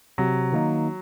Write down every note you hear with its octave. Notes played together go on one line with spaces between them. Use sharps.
C3 F#3
D#3 A#3 D#4